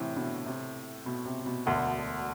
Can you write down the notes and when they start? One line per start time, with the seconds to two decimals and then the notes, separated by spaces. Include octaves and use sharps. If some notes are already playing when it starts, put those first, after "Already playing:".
Already playing: A2 C3 E3
0.16 B2 D3
0.46 C3
1.06 B2
1.26 C3
1.46 B2
1.66 E1 D2 B2 D3